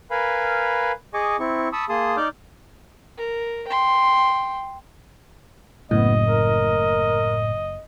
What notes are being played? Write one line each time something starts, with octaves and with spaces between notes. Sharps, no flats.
A#4 B4 F5 G#5 B5
G#4 D#5 G#5 C#6 D6
C4 E4 C#6
A5 B5 C#6 D#6 E6
A#3 G#4 A5 C6 D#6
D#4 D5 D6 F6 G6
A#4
G5 C6
F#1 A2 B3 D#5
A#4